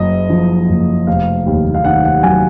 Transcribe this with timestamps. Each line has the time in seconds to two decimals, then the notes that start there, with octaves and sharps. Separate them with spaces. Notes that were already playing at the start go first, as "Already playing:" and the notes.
Already playing: F#1 F#2 D#5
0.30 F3
0.69 F#1
1.07 F1 F5
1.47 D#2
1.74 F5
1.84 D#3 F#5
2.05 F#5
2.23 F#3 G#5